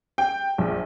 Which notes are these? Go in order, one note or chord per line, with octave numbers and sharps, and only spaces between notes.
G5
A#1